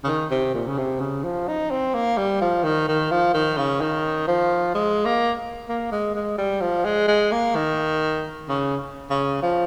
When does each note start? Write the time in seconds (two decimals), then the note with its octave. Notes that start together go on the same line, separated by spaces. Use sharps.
0.04 C#3
0.07 D#3
0.31 C3
0.54 A#2
0.67 C#3
0.78 C3
1.00 C#3
1.24 F3
1.48 D#4
1.71 C4
1.94 A#3
2.17 G3
2.41 F3
2.64 D#3
2.88 D#3
3.11 F3
3.34 D#3
3.58 C#3
3.81 D#3
4.28 F3
4.75 G#3
5.05 A#3
5.69 A#3
5.92 G#3
6.15 G#3
6.38 G3
6.61 F3
6.85 G#3
7.08 G#3
7.32 A#3
7.55 D#3
8.49 C#3
9.10 C#3
9.43 F3